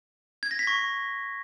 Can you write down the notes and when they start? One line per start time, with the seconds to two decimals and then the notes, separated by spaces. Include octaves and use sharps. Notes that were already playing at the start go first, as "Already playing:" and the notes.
0.43 G#6
0.51 A#6
0.59 B6
0.67 C#6